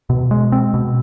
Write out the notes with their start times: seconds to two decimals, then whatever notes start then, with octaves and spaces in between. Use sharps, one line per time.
0.10 B2
0.31 G#3
0.52 C4
0.74 B2